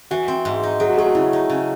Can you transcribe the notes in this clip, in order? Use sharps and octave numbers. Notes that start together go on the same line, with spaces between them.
E3 F#4
C4
G#2
D#4
F#3 G#4
F#4
A3 G#4
F#4
C#3 E4
D#4
C#3